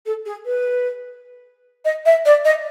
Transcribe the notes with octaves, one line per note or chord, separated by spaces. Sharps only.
A4
G#4
B4
D#5
E5
D5
D#5